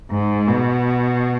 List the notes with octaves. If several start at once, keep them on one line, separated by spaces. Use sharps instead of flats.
G#2
B2